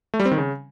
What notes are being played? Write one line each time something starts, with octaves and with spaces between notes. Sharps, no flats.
A3
G3
C4
D#3
C#3